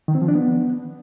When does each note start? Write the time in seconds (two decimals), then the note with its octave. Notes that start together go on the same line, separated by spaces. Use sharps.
0.08 D#3
0.15 C4
0.22 F3
0.28 D4
0.35 B3